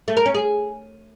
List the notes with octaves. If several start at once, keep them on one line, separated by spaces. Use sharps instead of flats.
A3
A#4
C#4
G#4